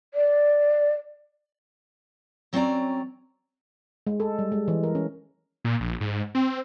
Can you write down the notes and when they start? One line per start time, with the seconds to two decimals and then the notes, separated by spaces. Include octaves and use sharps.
0.14 D5
2.53 F#3 C4 C#4 E4 D5 A#5
4.07 G#3
4.20 A4
4.39 G3
4.52 G#3
4.68 E3
4.83 A#4
4.95 C#4
5.65 A#2
5.80 A#1
6.01 G#2
6.35 C4